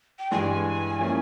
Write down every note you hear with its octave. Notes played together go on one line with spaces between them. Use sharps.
G5
G2 E3 G#3 G#5
F3 A#3 C#4 E4